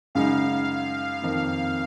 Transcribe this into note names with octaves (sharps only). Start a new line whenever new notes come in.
F#2 C#3 G#3 D#4 F5
F2 D#3 A#3